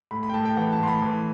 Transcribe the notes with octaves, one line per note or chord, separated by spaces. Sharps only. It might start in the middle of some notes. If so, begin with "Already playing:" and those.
A2 B5
B5
G5
A2 A5
G5
E3 F#5
A5
A2 C6
B5
E3